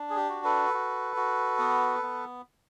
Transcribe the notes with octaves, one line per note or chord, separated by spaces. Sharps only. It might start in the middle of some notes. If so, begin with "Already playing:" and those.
Already playing: D4
G#4
G4
F#4
A4 B4
F#4
F#4
B3
B3